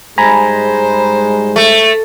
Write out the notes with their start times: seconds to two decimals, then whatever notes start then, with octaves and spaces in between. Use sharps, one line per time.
0.18 G#2 G3 G#3 C5 G#5 A#5 B5
1.56 A3